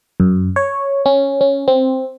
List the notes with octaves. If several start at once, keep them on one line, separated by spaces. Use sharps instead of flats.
F#2
C#5
C#4
C#4
C4